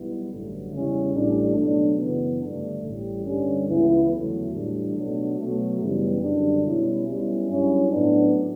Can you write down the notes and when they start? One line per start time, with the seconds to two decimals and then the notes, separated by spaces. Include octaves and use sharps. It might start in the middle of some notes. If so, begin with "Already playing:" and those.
Already playing: B1 B2 G3 B3 E4
0.28 A1 G2 D3 F#3 A3
0.71 E2 C#3 G3 C#4 E4
1.13 A1 A2 G3 D4
1.56 B2 F#3 A3 D4
1.98 F#2 C#3 E3 B3
2.41 G2 D3 A3 D4
2.83 A1 A2 G3
3.25 G2 D3 G3 C#4
3.67 C#2 C#3 E3 B3 E4
4.09 E2 D3 F#3 A3 E4
4.52 A2 E3 G3 D4
4.95 B1 B2 F#3 A3 D4
5.36 B2 F#3 A3
5.79 F#2 C#3 E3 G3 B3
6.21 F#2 D3 G3 D4
6.63 B2 G3 C#4 E4
7.06 B1 B2 G3 C#4 E4
7.48 G2 F#3 C#4 E4
7.90 A2 F#3 B3 D4